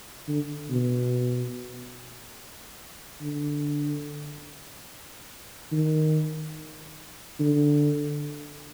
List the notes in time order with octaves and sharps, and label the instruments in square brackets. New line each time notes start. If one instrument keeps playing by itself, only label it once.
[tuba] D3
B2
D3
D#3
D3